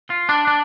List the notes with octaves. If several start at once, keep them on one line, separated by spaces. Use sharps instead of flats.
F4
D4
D4